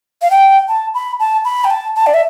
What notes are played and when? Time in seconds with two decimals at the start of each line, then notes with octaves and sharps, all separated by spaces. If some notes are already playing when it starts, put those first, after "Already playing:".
0.22 F5
0.31 G5
0.68 A5
0.94 B5
1.20 A5
1.45 B5
1.64 G5
1.70 A5
1.96 A5
2.07 D5
2.14 E5